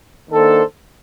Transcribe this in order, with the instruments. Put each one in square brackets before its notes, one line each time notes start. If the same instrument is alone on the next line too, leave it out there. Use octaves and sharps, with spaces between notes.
[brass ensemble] D#3 A#3 D4 A4 C5